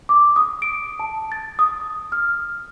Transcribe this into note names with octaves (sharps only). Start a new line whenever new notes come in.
D6
D#6
D7
A5
A6
D#6
F6